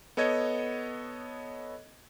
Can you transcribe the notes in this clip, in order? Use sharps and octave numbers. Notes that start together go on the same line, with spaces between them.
B3 A4 C#5 D#5 G#6